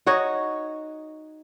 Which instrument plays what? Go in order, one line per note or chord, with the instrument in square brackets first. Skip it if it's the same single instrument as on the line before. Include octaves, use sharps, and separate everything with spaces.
[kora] D#4 F#4 C#5 D#5